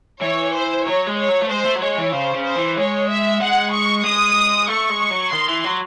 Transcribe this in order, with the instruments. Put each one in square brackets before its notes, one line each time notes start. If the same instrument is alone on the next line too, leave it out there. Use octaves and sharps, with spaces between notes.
[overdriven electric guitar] E3 [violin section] C#5
[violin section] C5
[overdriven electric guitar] F#3 [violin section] C#5
[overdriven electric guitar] G#3
[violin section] C#5
[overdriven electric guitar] F#3
A3
[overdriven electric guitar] G#3 [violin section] C5
[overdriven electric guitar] A3
F#3
[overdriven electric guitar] G#3 [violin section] C#5
[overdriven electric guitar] E3
[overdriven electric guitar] C#3 [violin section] C5
[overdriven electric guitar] C#3
[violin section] C5
[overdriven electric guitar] E3
[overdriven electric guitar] G#3 [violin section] C#5
[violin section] E5
[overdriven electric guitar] G#3 [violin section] F#5
[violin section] C#6
[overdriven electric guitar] G#3 [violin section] D#6
[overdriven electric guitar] A3 [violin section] C#6
[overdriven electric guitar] G#3
F#3
[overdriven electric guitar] D#3 [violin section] C6
[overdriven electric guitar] E3
F#3